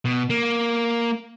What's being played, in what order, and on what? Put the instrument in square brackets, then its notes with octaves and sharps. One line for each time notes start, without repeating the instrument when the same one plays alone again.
[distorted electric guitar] B2
A#3